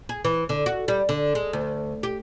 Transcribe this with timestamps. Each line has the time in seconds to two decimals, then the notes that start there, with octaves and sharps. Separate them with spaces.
0.09 G#4
0.24 E3
0.49 D3
0.66 F#4
0.88 G3
1.09 D3
1.35 G#3
1.53 D2
2.03 G4